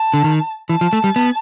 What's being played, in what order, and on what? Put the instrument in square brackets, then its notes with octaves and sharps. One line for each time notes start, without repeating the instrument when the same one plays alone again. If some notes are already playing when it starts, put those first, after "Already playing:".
Already playing: [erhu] A5
[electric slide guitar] D3
D#3
[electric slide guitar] E3 [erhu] A5
[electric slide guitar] F3
A3
G3
B3